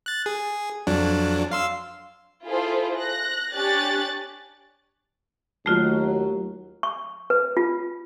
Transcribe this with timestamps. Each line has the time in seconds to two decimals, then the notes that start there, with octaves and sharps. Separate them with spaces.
0.06 F#6 A6
0.26 G#4
0.87 F2 F#3 D4
1.51 F5 C6 E6
2.45 E4 F4 G#4 A4 C5 F5
2.98 F#6 A#6
3.53 D4 G4 C#5 G#5 F#6 A6
5.66 D#2 F#3 A3 F4 F#4
6.83 C#6
7.30 B4
7.57 F4